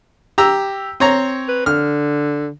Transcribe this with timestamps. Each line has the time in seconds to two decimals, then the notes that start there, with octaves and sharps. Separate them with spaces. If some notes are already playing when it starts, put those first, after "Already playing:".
0.38 G4 A#5 E6
1.00 C4 C#5 A#5
1.49 B4
1.66 D3 F6